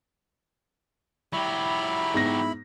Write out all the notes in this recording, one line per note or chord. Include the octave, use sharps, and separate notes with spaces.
F#3 E4 G4 B5
G#2 B3 A#6